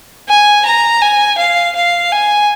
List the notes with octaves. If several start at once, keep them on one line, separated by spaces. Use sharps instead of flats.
G#5
A#5
G#5
F5
F5
G#5